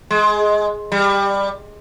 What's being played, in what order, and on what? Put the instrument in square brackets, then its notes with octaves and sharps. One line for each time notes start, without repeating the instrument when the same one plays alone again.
[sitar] G#3
G3